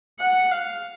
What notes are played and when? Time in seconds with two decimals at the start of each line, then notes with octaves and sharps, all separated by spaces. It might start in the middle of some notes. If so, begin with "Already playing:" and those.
0.20 F#5
0.51 F5